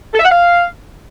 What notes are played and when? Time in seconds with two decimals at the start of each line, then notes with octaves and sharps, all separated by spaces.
0.14 A4
0.19 E5
0.25 F#5
0.30 F5